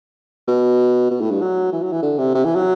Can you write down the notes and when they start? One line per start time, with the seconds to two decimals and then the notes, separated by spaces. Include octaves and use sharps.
0.48 B2
1.11 B2
1.21 A2
1.31 G2
1.41 F#3
1.72 E3
1.83 F#3
1.92 E3
2.03 D3
2.18 C3
2.34 C3
2.44 E3
2.55 F#3